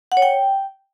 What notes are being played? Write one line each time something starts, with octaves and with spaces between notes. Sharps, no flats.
F#5
C#5
G5